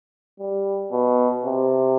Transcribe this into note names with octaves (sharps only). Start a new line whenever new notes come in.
G3
B2
C3